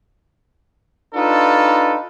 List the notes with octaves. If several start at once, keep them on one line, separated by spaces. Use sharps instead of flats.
D4 D#4 F4 A4 B4